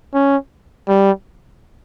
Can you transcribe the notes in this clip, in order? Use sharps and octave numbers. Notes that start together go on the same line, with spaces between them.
C#4
G3